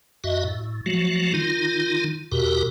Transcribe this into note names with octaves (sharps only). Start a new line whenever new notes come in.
F#2 F#4 D#5 E5
A2
F3 F#3 A3 F#4
D#3 D#4 F4
E2 B2 F#4 G4 A#4